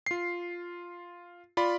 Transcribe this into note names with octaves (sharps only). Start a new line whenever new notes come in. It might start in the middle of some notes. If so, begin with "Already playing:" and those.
F4 C7
F4 D5 B5